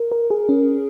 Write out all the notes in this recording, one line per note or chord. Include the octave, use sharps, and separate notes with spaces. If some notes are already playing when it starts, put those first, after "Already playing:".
Already playing: A#4
A#4
G#4
C#4